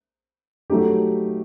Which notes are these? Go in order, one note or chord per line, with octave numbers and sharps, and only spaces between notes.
F#3 A3 D#4 G4